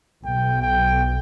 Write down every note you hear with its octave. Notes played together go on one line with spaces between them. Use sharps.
B1 B2 G5
G5